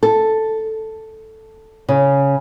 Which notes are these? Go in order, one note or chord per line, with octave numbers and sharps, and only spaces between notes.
A4
C#3